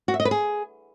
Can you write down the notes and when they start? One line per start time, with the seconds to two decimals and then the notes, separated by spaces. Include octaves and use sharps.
0.08 F#4
0.14 E5
0.20 D#5
0.25 B4
0.31 G#4